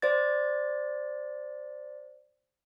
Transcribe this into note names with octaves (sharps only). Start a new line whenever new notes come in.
C5 D5 A6